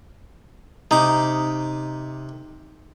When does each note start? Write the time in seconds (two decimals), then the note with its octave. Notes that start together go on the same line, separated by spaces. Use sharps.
0.91 C3 D#4 D6